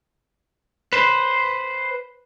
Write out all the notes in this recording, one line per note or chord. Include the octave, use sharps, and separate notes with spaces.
B4 C5